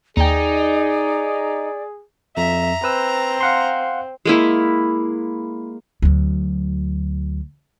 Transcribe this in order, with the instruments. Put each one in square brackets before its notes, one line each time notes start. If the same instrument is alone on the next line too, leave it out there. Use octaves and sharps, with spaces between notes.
[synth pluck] D#2 G5 [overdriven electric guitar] D#4 [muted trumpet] G#4 [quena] D5
[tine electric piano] F2 [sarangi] E5 [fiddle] A#5
[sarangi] C4 [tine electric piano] B4 E6
[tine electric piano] F5 F#5 C6
[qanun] G#3 A#3 E4
[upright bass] D2 F#3